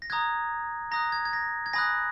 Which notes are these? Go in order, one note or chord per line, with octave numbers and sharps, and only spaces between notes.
A#6
A#5 D#6 F#6 G#6
A#5 D#6 F#6 A#6
G#6
G#6
A#6
G#6
G#5 B5 D#6 F#6 A#6